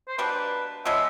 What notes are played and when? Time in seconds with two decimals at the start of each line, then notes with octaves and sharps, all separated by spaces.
0.08 C5
0.18 B2 G3 A#3 D4 B4
0.85 C#3 F3 G#3 B3 E5